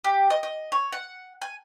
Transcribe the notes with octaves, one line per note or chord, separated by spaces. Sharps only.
G4
D#5
D#5
C#5
F#5
G#5